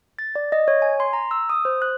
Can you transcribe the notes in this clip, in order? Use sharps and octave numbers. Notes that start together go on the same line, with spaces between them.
A6
D5
D#5
C#5
G#5
C6
A#5
E6
D#6
C5
F#6